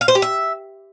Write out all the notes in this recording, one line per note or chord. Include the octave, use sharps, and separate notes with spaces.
F5
C5
G4
E5